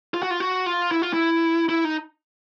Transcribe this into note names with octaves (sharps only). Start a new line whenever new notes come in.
F4
F#4
F4
F#4
F4
E4
F4
E4
E4
D#4